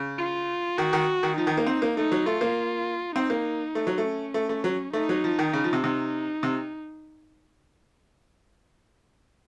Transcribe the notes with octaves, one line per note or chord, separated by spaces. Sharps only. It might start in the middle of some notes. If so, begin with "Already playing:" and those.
Already playing: C#3
F4
D#3 F#4
D#3
D#3
F3 D#4
D#3
A#3
C4
A#3
A3 D#4
F#3
A3 F4
A#3
C4 D#4
A#3
A3
F#3
A3
C#4
A3
A3
F#3
A3 D#4
F#3
F3
D#3
C#3
F3
C3
C3 D#4
C3